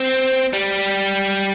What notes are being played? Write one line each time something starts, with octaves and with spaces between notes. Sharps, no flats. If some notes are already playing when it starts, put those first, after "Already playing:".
Already playing: C4
G3